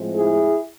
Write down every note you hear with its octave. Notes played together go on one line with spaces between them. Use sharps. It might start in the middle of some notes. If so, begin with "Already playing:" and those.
Already playing: A2 F3 G#3 C4
E4 G#4